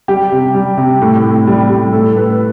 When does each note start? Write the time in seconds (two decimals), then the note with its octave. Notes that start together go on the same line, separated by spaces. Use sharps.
0.08 G3 G4
0.32 C3
0.55 G3
0.77 C3
1.02 A2
1.23 A2
1.47 G3
1.69 G3
1.93 A2 A4
2.16 A2 B4